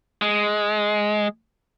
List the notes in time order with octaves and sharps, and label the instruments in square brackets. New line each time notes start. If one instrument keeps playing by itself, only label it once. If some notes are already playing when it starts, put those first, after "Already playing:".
[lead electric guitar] G#3